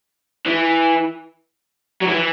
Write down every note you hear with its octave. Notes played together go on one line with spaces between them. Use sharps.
E3
F#3
E3